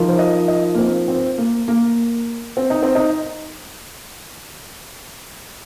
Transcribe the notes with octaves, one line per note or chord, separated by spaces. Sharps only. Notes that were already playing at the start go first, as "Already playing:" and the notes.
Already playing: F3 D#4 A#4
C5
D#5
D#5
A#3
C4
C4
A#3
A#3
C4
D#4
C4
D#4